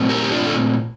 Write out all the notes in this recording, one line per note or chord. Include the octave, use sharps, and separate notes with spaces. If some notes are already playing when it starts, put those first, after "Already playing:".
Already playing: A#2 A3 C4
G4 A#4
G4
D4 F4
A4